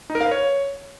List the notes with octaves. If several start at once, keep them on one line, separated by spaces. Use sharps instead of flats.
D#4
A#4
F5
B4
C#5